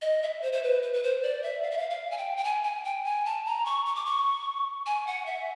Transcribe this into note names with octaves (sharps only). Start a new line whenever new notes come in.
D#5
E5
C5
C5
B4
B4
B4
C5
D5
E5
F5
E5
F5
F5
G#5
G5
G5
G#5
G#5
G5
G#5
A5
A#5
C#6
C#6
D6
C#6
G#5
F#5
E5